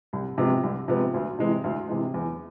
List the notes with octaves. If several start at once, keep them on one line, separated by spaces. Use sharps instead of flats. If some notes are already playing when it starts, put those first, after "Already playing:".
C2
C3 F3 G#3 B3
C2
C3 F3 G#3 B3
D2
C3 E3 G#3
D2
C3 E3 G#3
E2